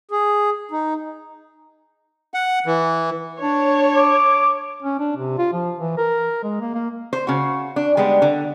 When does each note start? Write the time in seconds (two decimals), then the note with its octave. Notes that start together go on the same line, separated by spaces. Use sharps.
0.11 G#4
0.71 D#4
2.34 F#5
2.66 E3
3.42 D4 C#5
3.96 D6
4.82 C#4
5.00 D4
5.16 C3
5.38 F4
5.53 F3
5.78 E3
5.98 A#4
6.43 G#3
6.61 A#3
6.74 A#3
7.13 C5
7.27 C#3 F#4
7.76 D4
7.97 G3 G#3 B3 D4
8.22 D3